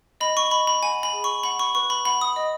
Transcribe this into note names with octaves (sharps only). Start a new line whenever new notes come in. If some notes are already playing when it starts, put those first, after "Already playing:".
D#5 B5
C#6
D#5 B5
B5
F#5 G#5
B5
G#4
C#6
F#5 B5
C#6
B4 C#6
B5
F#5 B5
D#6
D#5